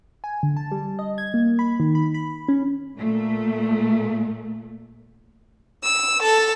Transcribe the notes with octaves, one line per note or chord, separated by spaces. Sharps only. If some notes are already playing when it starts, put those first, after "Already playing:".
G#5
D3
A5
G3
D#5
G#6
A#3
B5
D#3
B5
B5
C#4
A#2 A3
E6
A4